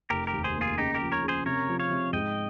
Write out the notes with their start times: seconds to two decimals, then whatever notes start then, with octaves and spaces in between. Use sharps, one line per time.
0.10 F1 G4 A#4
0.27 G4 A#4
0.33 D#2
0.44 G#4 C5
0.55 A#3
0.61 F4 G#4
0.78 C#3 D#4 G4
0.94 G4 A#4
1.01 F3
1.12 A#4 C#5
1.23 C#3
1.28 G#4 C5
1.46 C3 A#4 C#5
1.69 F3
1.80 C#5 F5
1.91 C3
2.13 G#2 D#5 G5